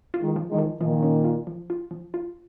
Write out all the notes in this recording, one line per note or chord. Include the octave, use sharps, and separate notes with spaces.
F4
D#3 G#3
F3
D#3 G#3
F3
A#2 D#3 F3
C#4
F4
F3
F4
F3
F4